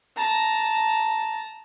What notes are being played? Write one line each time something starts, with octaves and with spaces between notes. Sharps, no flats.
A5 A#5